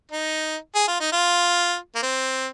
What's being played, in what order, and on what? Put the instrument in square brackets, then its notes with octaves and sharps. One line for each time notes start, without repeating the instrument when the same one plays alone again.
[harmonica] D#4
G#4
F4
D#4
F4
A#3
C4